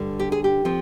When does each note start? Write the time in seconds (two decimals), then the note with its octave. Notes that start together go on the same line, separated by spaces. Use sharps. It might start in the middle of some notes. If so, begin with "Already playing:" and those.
Already playing: G2 D3 G3
0.20 G4
0.32 G#4
0.44 G4
0.65 F3 C4